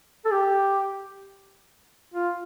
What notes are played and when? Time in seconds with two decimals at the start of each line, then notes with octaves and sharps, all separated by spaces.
0.25 A4
0.31 G4
2.14 F4